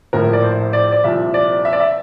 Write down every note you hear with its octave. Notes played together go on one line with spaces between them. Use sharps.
A#1 A2 F3 A#4
D5
C5
D5
D5
C2 A#2 F3 E5
D5
E5
D5
E5